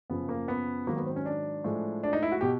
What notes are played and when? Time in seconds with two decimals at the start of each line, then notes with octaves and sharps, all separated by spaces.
0.10 F#2 C#3 F3 B3
0.29 A#3
0.48 B3
0.87 G#2 D#3 F#3 A#3
0.97 B3
1.06 C4
1.16 C#4
1.26 D4
1.64 A2 F3 G#3
2.03 D4
2.13 D#4
2.23 E4
2.32 F#4
2.41 B2 G4